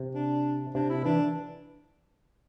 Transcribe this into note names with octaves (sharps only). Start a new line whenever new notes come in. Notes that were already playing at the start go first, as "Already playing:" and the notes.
Already playing: C3
D4
C3 D4
E4
E3 D4